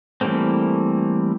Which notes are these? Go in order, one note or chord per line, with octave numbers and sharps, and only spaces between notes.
E3 G3 A3 A#3 C4